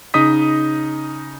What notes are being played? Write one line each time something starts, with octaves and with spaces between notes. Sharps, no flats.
C#3 D#4 D#5 D#6 B6